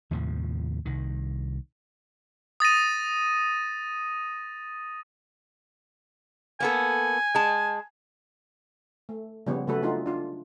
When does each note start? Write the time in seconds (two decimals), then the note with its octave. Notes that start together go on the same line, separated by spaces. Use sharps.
0.11 D#2 A2 C3 F3
0.85 C2 D#3
2.60 D#6 A6 A#6 D#7
6.60 A#3 B3 A4 G#5
7.35 G#3 A5
9.09 A3
9.47 C#3 F3 G3 B3 C#5
9.67 C#3 F#3 A3 F#4 A4 B4
9.82 A3 D4 D#4 F4 F#4 G#4
10.06 D4 F4